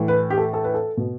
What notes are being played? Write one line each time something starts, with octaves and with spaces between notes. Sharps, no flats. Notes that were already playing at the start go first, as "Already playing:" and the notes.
Already playing: A2 E3
B4
G4
A4
A4
B4
A4
B2